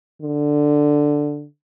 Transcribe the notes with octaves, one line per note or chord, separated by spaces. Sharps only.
D3